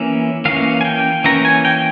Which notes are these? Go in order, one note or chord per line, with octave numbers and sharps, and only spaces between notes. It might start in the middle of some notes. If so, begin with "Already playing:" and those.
Already playing: E3 A#3 C#4 E5
E3 A#3 C#4 F5
G#5
G5
E3 A#3 C#4 A#5
G#5
G5